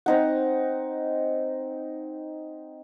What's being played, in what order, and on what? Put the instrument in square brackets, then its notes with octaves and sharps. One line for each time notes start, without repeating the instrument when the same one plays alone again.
[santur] C4 D#4 F#5